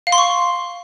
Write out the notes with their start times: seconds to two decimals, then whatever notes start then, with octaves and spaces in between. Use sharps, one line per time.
0.07 F5
0.12 C6
0.18 C#6